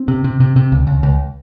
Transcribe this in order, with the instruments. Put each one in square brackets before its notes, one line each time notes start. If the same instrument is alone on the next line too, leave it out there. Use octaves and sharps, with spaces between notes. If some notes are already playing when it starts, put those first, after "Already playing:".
Already playing: [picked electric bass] C4
C3
C3
C3
C3
C#2
C#2
C#2